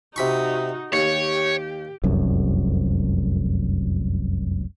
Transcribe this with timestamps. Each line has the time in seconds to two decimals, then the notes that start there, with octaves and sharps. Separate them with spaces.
0.16 C3 D#4 F#4 B5 C#6
0.93 D#2 G4 C#5
2.04 F1 C2 F#2